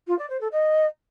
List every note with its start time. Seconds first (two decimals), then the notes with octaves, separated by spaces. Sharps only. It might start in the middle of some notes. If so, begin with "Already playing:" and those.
0.07 F4
0.18 D5
0.29 C5
0.40 A4
0.52 D#5